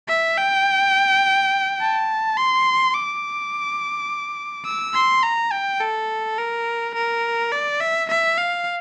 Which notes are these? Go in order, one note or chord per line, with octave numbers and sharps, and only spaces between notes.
E5
G5
A5
C6
D6
E6
C6
A#5
G5
A4
A#4
A#4
D5
E5
E5
F5